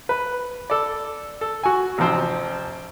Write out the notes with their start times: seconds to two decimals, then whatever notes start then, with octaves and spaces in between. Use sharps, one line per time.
0.09 B4
0.70 A4 D5
1.41 A4
1.63 F#4 G#5
1.98 A1 C3 F3 C4 C5